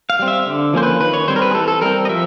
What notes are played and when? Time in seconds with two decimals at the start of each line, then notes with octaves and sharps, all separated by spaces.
0.10 F5
0.19 G3 C4
0.28 E5
0.47 D3
0.73 F3 A#3 C#4 C5
0.83 B4
1.00 D#3 B4
1.13 C#5
1.28 G3 C4 C5
1.36 A#4
1.42 B4
1.51 G#4
1.55 E3 A4
1.68 A4
1.82 G3 C4 A#4
2.05 D#5
2.09 F3 E5